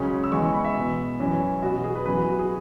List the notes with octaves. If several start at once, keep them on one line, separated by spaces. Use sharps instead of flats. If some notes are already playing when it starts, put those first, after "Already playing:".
Already playing: C#2 C#3 F#3 C#4 G#5
E6
E2 E3 G#3 C#6
C#6
B5
E5
B2 B3
F#2 E3 C#4
B2 B3 F#4
F#4
G#4
B4
F#2 E3 B3 B4
F#4
F#4
G#4